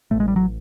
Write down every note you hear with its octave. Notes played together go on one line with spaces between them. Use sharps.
A1 A2 A3
G#3
G3
F#3